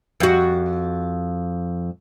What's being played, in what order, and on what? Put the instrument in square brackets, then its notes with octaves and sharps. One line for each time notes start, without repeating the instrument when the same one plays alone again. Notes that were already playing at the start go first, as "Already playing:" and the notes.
[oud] F2 F#4